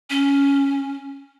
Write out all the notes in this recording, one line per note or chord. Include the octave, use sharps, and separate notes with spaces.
C#4